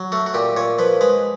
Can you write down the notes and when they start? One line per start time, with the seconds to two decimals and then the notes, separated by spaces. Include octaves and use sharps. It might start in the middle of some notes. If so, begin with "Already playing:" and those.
Already playing: F#3
0.12 A3 F#4
0.26 F#4
0.34 A#2 G4
0.56 A#2 C#5
0.79 F3 B4
1.01 G#3 B4